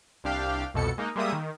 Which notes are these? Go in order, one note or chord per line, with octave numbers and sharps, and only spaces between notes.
C2 D4 G4 F5 G5
C2 F2 B2 A4 C#7
G#3 A#3 D#4
G3 G#3 A#3 E5 D#6
D#3